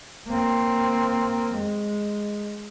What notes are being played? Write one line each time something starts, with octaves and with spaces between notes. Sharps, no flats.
A#3 C4
G#3